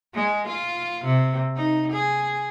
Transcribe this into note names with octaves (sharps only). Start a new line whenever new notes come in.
G#3
F4
C3
D#4
G#4